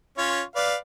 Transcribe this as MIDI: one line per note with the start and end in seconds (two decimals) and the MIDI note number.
0.18 0.41 61
0.18 0.41 65
0.18 0.41 73
0.56 0.75 71
0.56 0.75 74
0.56 0.75 77